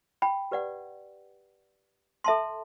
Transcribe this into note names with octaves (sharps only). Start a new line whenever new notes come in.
G5 B5
G4 B4 D5 F#5
A4 E5 A5 C6